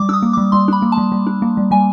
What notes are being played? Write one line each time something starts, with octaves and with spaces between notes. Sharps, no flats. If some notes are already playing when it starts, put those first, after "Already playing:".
Already playing: G3 D6
D4 D#6 E6
A#3
G3 D6
G3 C6
D4 B5
A#3
A5
G3
G3
D4
A#3
G3
G3 G#5